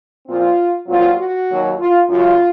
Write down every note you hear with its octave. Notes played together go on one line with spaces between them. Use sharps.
A#2 F3 C4 F4
A#2 F#3 C4 F4
F#4
D#2 D#3 F#3
F4
F#2 C#3 F#3 F4